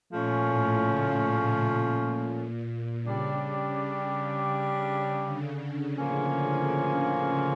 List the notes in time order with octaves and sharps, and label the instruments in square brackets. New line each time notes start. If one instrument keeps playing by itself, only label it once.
[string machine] A#2 [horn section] F3 A3 C#4
[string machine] A2
C#3
A#2
[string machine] C#3 [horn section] G3 D4 G4
[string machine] C#3
D3
[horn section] A2 F3 A#3 C#4 F4